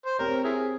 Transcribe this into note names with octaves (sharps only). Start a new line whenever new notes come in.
C5
C4 G4 A#4 C#5
E4 G#4